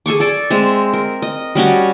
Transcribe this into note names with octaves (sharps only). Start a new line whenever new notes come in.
G#4 A4 C#6 D6
A4 D5
G#3 C4 E5
A#4
D#5
G3 C#4 F#4 A5